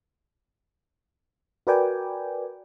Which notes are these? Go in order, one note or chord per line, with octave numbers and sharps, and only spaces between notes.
F#4 A#4 B4 D5 G5 G#5